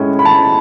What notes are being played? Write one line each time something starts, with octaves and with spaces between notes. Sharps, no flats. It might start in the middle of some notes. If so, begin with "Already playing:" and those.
Already playing: A2 G#3 C#4 E4
B5
A5